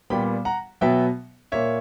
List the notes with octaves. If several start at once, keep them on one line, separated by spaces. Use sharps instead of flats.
A#2 G3 B3 G5 B5
F#5 A#5
B2 F#3 B3 E5 G5
A#2 A#3 C#5 E5